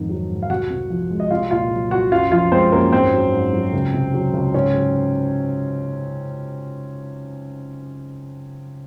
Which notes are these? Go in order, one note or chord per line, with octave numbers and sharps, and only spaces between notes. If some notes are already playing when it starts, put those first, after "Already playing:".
Already playing: F2 G#2 D#3
F#3
G#2
F5
C2 F#4 F#5
C3
F3
G#3
D#5
C2 F4 F5
A#2 F4 F5
F#3
C2 F#4 F#5
F#2 F4 F5
F3 F4 F5
G#3 C4 C5
F#2 A#3 A#4
G#2 C4 C5
F#3
G#2
F#3
C#2
C3
F#3
C#2
G#2 C#4 C#5
F#3